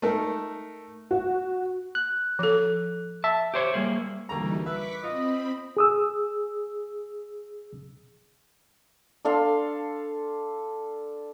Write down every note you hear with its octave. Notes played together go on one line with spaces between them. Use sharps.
A3 D#4 A#4
F#4
F#6
F3 A4
E5 A5
G4 C5 C#5
G3 A#3 G#4
D2 E3 G3 A#3 D#4 A#5
B4 E5 C#6 D6 B6
C4 F4 D#5 B5
G#4 D#6 E6
D4 A4 F5 C6